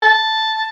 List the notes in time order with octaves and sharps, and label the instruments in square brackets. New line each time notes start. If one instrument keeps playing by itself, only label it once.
[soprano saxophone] A5